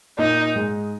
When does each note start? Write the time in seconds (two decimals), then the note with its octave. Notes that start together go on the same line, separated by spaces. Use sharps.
0.18 A#2 A#3 D#4
0.55 G#2 G#3